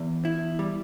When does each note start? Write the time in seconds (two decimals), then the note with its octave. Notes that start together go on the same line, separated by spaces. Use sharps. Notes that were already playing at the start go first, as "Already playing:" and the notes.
Already playing: E2
0.25 E4
0.59 G3